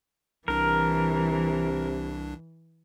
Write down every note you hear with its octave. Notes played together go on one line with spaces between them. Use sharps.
C2 C3 E3 D4 A#4